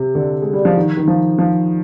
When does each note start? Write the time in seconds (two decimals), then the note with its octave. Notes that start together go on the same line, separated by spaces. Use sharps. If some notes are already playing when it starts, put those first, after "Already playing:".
Already playing: C3
0.15 D3
0.42 G#3
0.53 G3
0.65 F3
0.77 D#3
0.97 D#3
1.08 F3
1.39 F3